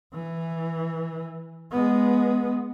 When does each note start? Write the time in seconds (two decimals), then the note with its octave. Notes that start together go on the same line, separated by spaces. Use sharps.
0.13 E3
1.72 G#3 B3